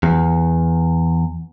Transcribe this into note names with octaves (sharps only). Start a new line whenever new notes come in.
E2